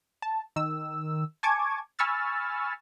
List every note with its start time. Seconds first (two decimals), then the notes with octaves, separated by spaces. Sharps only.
0.22 A5
0.56 D#3 E6
1.43 G#5 A5 C#6 D6 G#6
1.99 G#5 B5 C#6 E6 F6 A6